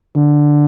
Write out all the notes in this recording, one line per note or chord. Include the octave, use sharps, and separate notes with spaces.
D3